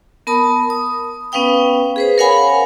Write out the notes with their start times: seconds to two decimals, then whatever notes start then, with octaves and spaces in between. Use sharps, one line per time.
0.27 B3 A#4 A5 B5 D#6
0.70 D#6
1.32 B3 C#4 B4 F5 G5 D#6
1.96 G#4 B4 C5
2.18 A#4 C#5 F5 F#5 G#5 B5